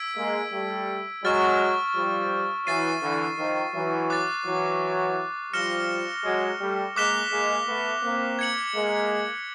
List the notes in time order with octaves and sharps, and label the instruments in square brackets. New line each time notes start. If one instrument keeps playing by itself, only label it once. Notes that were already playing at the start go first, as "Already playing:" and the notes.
Already playing: [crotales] E6 G#6 B6 D7
[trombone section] G#3 A#3
G3 A3
[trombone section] F#3 G#3 [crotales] C#6 F6 A6
[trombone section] F3 G3
[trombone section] E3 F#3 [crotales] A6 C7 D#7
[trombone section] D3 E3
D#3 F3
E3 F#3
[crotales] D6 F#6 A6
[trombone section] E3 F#3
[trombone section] F3 G3 [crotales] F6 A#6 C#7 E7 G7
[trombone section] F#3 G#3
G3 A3
[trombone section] G#3 A#3 [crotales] D6 F#6 B6 E7 G7
[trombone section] G#3 A#3
A3 B3
A#3 C4
[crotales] G#6 C#7 F#7
[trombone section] G#3 A#3